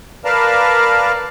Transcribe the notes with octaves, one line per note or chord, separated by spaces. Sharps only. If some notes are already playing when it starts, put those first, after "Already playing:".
A#4 B4 D5 F5 A5